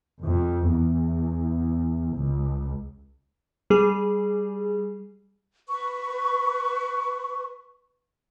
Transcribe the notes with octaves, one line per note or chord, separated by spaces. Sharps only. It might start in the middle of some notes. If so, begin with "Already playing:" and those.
F2
E2
C#2
G3 G#4
B4 C#6